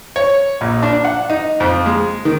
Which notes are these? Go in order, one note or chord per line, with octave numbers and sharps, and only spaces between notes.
C#5
A#1
D4
F#5
D#4
F2
G#3
D#3